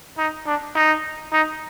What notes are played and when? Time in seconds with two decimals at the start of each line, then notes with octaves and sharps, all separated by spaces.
0.18 D#4
0.47 D4
0.75 D#4
1.33 D#4